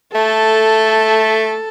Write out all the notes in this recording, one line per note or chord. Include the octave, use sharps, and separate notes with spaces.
A3 A4